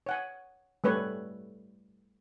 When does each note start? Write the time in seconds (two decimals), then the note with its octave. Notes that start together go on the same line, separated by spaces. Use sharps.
0.06 C#5 F#5 G#5
0.84 G3 A3 B4 C#5